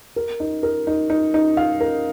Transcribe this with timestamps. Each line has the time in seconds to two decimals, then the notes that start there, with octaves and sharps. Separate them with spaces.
0.16 A#4
0.40 D#4
0.63 A#4
0.87 D#4
1.10 D#4
1.34 D#4
1.57 F5
1.80 A#4